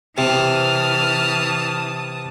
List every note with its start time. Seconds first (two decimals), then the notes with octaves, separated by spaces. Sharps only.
0.18 C3 E3 A5 D#6 F6